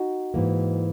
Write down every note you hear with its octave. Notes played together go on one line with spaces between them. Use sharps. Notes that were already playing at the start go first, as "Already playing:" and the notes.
Already playing: D#4 F#4
G#2 E3 A#3